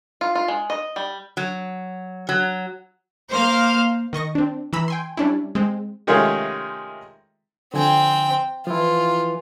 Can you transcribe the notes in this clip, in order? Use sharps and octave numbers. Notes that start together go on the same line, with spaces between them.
F4
F4
G#3
D#5
G3
F#3
F#3
A#3 C5 F5 F6
D#3 D#5 C#6 A#6
C4 D4
E3 A#5 B5 E6
G5 G#5 C6
G3 C#4 D4 E4
G#3 C4
C3 D#3 G#3 A3 C#4 F4
D3 F3 C4 G5 G#5
E3 F3 E4 F4